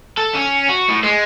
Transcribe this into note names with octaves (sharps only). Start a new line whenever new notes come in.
A4
C#4
F#4
A2
G#3